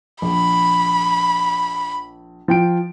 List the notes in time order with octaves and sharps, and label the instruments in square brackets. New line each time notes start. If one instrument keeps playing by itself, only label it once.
[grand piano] A#1 [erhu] B5
[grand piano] F3 G5 D7